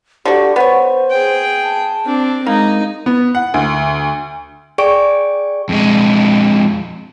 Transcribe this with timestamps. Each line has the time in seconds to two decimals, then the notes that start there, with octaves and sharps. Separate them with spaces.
0.25 D3 F#4 G4
0.56 B3 C5 C#5
1.11 G#4 G5
1.63 A5
2.05 C4 D4
2.47 G#3 A#3 D#4
3.06 B3
3.35 F#5
3.54 D2
4.78 G#4 D5 G5 C#6 D7
5.69 F2 G#3